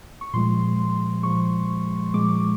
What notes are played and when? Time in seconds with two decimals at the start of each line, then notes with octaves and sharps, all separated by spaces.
0.21 C#6
0.34 A#2 F3 G#3 C6
1.23 A#2 F3 G#3 C#6
2.14 A#2 F3 G#3 D6